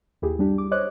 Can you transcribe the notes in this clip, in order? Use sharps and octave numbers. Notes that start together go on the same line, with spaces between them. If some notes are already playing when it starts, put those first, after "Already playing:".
D#2 E4 G4 G#4
G2 G3 D4 G4
D6
C5 C#5 D#5 D6 F#6